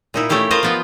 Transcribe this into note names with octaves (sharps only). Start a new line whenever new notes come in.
A#2 D#4 E4
A3 C#4 E4 G4 F5
F4 A#4 C5 D#5 F5
F3 B3 F4